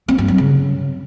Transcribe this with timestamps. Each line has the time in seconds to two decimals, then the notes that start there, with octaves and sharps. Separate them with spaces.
0.08 C4
0.18 G2
0.28 F#3
0.38 C#3